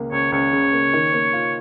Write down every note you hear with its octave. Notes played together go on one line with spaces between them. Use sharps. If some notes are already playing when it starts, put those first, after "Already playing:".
Already playing: C#2 A#3
C#2 C#5
C#2 C#5
C#3
A#3
D#3
A#3
F4